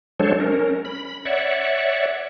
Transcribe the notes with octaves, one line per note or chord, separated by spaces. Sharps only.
F#3 G#3 D4 A4 C5 C#5
C#4 A#4
B5
C#5 D5 E5 F#5